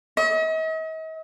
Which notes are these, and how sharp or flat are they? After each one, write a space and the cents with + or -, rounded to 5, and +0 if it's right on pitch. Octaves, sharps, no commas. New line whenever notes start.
D#5 +45